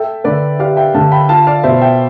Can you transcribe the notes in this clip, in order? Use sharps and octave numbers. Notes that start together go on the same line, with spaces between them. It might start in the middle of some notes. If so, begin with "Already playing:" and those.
Already playing: A4 E5 G5
D3 B4 D5
G4 D5 F5
E5 G5
D3 F5 A5
G5 B5
F4 F5 A5
D5 F5
B2 C5 E5
E5 G5